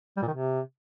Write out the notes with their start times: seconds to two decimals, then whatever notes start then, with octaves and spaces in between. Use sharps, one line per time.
0.17 G3
0.22 A#2
0.28 D#3
0.33 C3